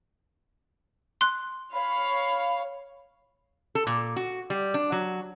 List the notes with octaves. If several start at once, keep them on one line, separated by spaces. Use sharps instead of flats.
C6 F#6
C#5 F5 B5
A4
A#2
F#4
G3
D4
F#3